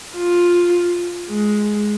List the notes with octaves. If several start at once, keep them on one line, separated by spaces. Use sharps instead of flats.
F4
G#3